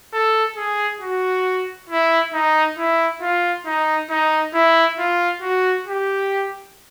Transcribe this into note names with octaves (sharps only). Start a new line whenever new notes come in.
A4
G#4
F#4
E4
D#4
E4
F4
D#4
D#4
E4
F4
F#4
G4